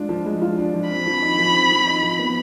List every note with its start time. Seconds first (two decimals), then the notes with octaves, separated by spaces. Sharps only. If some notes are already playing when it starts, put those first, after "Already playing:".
Already playing: G#3 D4 F4
0.09 F3
0.26 G#3
0.42 F4
0.58 D4
0.74 F3
0.90 C4 B5
1.06 F3
1.22 D#4
1.39 F3
1.55 C4
1.71 F3
1.87 D#4
2.03 F3
2.19 B3